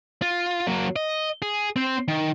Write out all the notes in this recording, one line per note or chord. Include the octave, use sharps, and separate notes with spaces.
F4
F#3 A#3
D#5
G#4
C4 C5
D#3